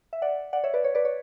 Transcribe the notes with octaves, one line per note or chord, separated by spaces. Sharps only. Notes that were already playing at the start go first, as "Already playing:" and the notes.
E5
D5 F#5
D5 F#5
C#5 E5
B4 D5
C#5
B4 D5
C#5